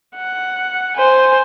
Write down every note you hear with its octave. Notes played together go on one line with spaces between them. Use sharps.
F#5
C5 G#5